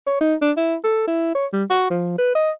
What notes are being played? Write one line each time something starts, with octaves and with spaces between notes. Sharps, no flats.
C#5
D#4
D4
E4
A4
E4
C#5
G3
F#4
F3
B4
D#5